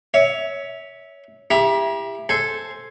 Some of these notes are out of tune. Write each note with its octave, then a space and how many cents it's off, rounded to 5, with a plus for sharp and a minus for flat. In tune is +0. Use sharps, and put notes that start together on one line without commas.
C#5 +15 E5 -15
E4 +15 G4 +25 A#5 +45
A4 +0 C5 +0 G#5 +0